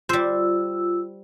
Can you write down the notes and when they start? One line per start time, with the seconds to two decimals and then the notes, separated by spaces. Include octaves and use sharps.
0.09 G3 F4 C5 E6